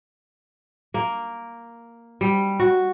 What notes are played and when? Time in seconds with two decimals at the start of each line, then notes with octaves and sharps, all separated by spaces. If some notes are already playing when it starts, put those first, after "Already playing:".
0.94 A#3
2.21 G3
2.60 F#4